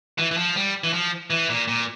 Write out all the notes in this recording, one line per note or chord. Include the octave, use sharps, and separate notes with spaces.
E3
E3
F3
G3
E3
F3
E3
A#2
A#2